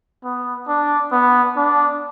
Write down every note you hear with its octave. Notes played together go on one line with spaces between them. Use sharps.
B3
D4
B3
D4